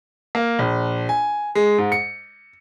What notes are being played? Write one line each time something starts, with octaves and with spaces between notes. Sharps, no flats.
A#3
A#1
G#5
G#3
G#2
C#7